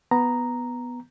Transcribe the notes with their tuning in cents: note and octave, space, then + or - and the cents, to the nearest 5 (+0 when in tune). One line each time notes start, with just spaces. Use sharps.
B3 +0 A#5 +0